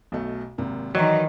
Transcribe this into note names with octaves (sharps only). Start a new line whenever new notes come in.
B1 B2 A3
G#1 C3 A#3
D#3 E3 F#3 D5 D#5 A#5